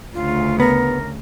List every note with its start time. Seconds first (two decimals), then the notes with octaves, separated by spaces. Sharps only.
0.14 D2 C#3 F4
0.60 B3 A#4